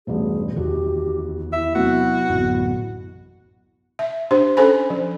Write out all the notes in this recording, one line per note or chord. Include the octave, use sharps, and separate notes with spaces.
E1 A1 G2 G#4
E2 D#3 F#4 G4
E4 E5
C3 F#3 B3 F#4
A1 F#2 B2
E5
D4 G4 C5
C#4 A4 C5 G#5 B5
F3